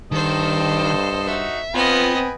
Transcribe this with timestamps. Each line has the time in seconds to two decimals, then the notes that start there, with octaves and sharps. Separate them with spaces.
0.12 G2 D#3 A4 C5 D#5
1.28 D#4 F#4 E5
1.74 B3 C4 F4 B4 D#5 G5 G#5